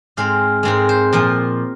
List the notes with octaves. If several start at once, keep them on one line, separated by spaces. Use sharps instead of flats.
G#2 G#3 C4 F5
G#2 G#3 C4 A#4
C5
A#2 F3 A#3 A#4